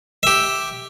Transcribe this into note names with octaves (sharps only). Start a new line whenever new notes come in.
G4 E5